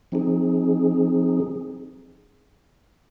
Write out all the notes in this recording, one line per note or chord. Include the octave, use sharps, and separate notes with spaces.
F3 C4 D#4 G#4